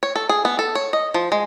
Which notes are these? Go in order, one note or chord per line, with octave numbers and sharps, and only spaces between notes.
C#5
A4
G#4
B3
A4
C#5
D#5
F3
G#3